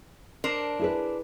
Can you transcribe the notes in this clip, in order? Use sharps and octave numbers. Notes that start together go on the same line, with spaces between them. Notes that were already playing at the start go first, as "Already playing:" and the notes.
D4 A#4 C5
E4 G#4 B4